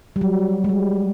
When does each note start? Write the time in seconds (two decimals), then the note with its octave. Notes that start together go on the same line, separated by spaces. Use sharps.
0.16 G3
0.21 F#3
0.64 G#3
0.69 G3